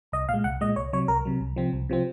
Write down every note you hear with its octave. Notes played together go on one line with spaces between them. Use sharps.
C2 D#5
A#2 F5
G#3
C2 F#5
A#2 G#3 D#5
C2 C#5
C3 F#3 C#5
C2 A#4
C3 F#3
C2
C3 F3 C4
C2
C3 F3 C4